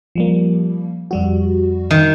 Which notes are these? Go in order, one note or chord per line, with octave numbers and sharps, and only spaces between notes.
F3 G3 A#3
F2 G3 F#4
D#3